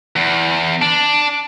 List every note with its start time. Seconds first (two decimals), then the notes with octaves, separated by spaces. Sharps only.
0.16 E2
0.82 D4